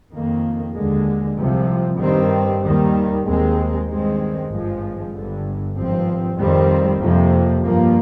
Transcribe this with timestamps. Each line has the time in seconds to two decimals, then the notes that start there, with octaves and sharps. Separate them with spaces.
0.11 F2 D#3 A#3
0.75 D#2 D3 G#3
1.38 C2 C3 F3
1.99 G2 D#3 G3 C4
2.63 D#2 D#3 G3
3.25 D#2 D#3 G#3 C4
3.87 G2 D#3 G#3 C4
4.50 G#1 G2 F3 G#3
5.12 G1 G2 D3
5.76 G#1 G2 F3 C4
6.38 F2 D#3 G3 C4
7.00 F2 C3 F3 A#3
7.64 G2 F3 A#3